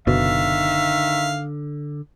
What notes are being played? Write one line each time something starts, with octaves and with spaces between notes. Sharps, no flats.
F#1 B2 D3 D#3 E5 F5